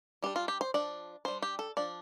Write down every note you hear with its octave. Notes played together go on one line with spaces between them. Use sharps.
G3 D4 G4
F4
G4
C5
F3 D4 D5
G3 D4 C5
G4
A4
F3 D4 D5